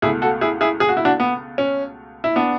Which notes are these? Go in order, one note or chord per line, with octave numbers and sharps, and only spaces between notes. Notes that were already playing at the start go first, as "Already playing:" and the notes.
C#2 B2 A3 E4 G#4
F#4 A4
E4 G#4
E4 G#4
G#4
F#4
E4
D4 F#4
B3
C#4
E4
B3 D4